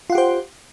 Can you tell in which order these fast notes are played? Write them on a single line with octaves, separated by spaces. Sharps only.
F4 F#5 G4 C5